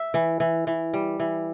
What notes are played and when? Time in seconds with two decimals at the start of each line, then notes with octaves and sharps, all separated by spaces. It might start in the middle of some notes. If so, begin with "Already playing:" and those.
Already playing: E5
0.14 E3
0.40 E3
0.67 E3
0.94 G3
1.20 E3